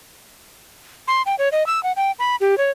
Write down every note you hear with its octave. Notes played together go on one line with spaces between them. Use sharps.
C6
G5
C#5
D#5
E6
F#5
G5
B5
G4
C#5